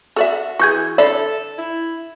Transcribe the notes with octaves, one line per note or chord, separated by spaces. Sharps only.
F#4 A4 D5 E5
E3 F#4 G#4 C#6 G6 G#6
D3 A4 D5 E5 B5
E4